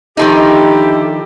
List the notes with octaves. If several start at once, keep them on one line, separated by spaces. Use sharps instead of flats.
D3 D#3 F3 D#4 E4 G4